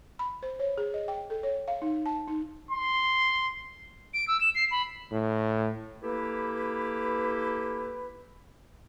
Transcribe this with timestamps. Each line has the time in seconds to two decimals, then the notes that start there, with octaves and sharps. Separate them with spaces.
0.19 B5
0.43 C5
0.59 C#5
0.78 G#4
0.94 D#5
1.08 G5
1.30 A4
1.43 C#5
1.68 F5
1.82 D#4
2.06 A5
2.28 D#4
2.71 C6
4.14 D7
4.28 E6
4.41 E7
4.55 C7
4.71 B5
5.12 A2
6.02 A#3 E4 G4 A4 B4